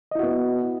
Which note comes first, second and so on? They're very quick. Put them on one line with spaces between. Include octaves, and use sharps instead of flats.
D#5 E4 F#4 B3